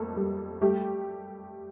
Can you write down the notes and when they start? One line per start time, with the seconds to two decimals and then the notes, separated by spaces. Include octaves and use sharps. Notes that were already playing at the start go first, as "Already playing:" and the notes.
Already playing: F2 A3 A#3 A4
0.16 G3
0.61 G3 A3 G4